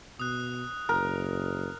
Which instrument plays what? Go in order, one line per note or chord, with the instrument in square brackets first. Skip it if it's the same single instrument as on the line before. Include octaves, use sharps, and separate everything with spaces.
[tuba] B2 [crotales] D#6 F#6
[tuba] F#1 [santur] A#4